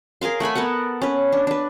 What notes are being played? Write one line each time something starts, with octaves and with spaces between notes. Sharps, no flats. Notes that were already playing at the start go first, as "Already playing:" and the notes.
G#4 A#4 F5 C6
A3 F#5 G#5 B5
B3 A4 A#4 F#5
C#4 B4
D4
D4 B4